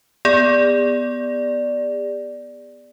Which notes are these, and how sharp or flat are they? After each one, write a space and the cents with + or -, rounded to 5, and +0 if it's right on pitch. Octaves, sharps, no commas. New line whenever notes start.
B3 +0 G#4 -45 D5 +0